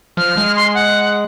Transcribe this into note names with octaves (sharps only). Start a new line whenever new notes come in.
F3 F6
G#3
C6
F#5